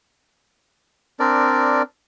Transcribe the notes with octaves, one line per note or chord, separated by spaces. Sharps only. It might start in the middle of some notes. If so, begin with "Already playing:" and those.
C4 D4 A#4 D5